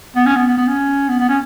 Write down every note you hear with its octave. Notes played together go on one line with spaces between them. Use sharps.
B3
C#4
B3
B3
B3
C#4
B3
B3
C#4